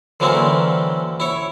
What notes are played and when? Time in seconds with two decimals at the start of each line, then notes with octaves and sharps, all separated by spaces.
0.20 D3 E3 F#3 A#3 C4 C#4
1.20 E4 C#5